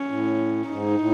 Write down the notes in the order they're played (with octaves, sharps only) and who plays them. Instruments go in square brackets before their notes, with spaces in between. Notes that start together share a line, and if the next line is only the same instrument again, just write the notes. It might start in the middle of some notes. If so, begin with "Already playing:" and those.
Already playing: [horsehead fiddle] C#4
[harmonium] A2
[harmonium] G#2 [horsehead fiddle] D#4
[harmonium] A2